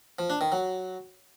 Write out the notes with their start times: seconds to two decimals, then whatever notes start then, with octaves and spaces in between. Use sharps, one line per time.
0.19 F3
0.30 D4
0.41 D#3
0.52 F#3